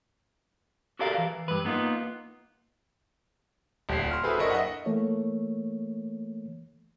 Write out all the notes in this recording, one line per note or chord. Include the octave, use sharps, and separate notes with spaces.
F#4 G4 A4 A#4 D5 F5
E3
G2 B4
A#3 B3 D#4 F4
D#1 D2 C7
C6 F6
E4 F#4 G#4 A4 B4 C5
F#1 D4 E4 A#4 D#5 C#6
D#5 E5 F#5
E3 A3 A#3 C#5